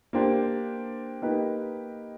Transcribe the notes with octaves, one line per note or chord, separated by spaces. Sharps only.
A#3 D4 G4 C5
A#3 D#4 G4 B4